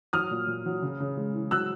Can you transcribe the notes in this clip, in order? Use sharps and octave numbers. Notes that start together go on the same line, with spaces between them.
F#3 D#6 F6
A#2
A#2
F#3
C#3
C#3
G#3
E3
F#3 E6 F#6